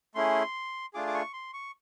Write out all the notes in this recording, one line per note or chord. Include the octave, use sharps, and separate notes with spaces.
A3 C#4 E4 G#4 C6
A3 D4 F4 G#4 D6
D6
C#6
C6
C#6